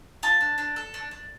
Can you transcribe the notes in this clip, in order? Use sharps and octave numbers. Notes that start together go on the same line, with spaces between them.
F4 A5
D4
D4
A4
D4
D4